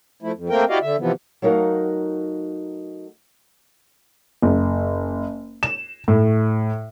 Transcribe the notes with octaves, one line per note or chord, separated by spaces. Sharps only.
F3 A3 E4
F2
A3 A#3 C4 A#4 G5
E4 F#4 G4 D5 D#5 F5
D3 E5
C3 E3 F3 B3
F#3 A3 D#4 A#4 F5 F#5
F#1
E7
A2